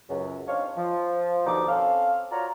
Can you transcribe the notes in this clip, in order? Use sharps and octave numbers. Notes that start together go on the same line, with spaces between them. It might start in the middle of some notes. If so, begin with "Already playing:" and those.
C#2 F#2
C4 D4 D#4 C#5 F5
F3
D#2 B2 D3 D#4 D6
C4 C#4 A4 F5
F4 F#4 C#5 D5 A#5